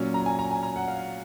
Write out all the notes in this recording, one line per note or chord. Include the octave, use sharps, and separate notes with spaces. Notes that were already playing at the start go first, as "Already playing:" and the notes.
Already playing: A#2 F#3 C#4
A#5
G#5
A#5
G#5
A#5
F#5
F5